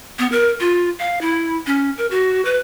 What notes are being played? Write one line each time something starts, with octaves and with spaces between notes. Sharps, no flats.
B3
A#4
F4
F5
E4
C#4
A#4
F#4
B4